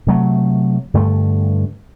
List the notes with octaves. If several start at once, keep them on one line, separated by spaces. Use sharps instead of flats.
C3 F#3 A3
G2 D3 A3